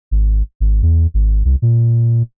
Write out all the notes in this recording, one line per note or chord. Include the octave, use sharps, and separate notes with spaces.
G#1
G#1
E2
G#1
C2
A#2